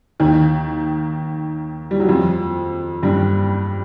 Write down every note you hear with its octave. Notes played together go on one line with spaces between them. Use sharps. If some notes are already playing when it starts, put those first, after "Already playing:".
D#2 D#3
G3
F#3
F2 F3
G2 G3